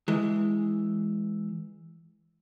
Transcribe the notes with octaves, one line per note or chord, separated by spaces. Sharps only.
E3 G#3